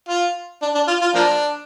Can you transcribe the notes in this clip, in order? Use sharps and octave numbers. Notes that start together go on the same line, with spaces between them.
F4
D4
D4
F4
F4
F3 A#3 D4